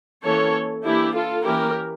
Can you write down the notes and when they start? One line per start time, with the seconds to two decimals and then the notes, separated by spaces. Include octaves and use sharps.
0.24 E3 A#3 C#4 A4 C#5
0.84 E3 A#3 D4 E4 G4
1.15 F4 A4
1.45 E3 A#3 C#4 E4 G4 A#4